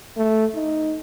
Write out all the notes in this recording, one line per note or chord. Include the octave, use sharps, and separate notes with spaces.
A3
D#4